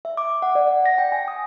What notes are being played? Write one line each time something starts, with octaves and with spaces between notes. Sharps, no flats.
E5
D6
E5
F#5
D5
F#5
A#6
G5
G#5
D#6